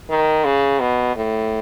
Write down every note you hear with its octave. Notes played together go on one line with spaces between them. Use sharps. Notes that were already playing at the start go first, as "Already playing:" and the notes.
D#3
C#3
B2
A2